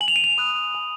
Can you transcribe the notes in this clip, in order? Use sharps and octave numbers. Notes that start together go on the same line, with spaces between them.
G#5 F#7
F7
D#7
F7
B5 D#6 F#6
G#5